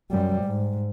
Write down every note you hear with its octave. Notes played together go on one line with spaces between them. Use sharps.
F#2 G3
G#2